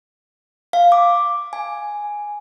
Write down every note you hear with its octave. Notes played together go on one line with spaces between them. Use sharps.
F5
D6
G#5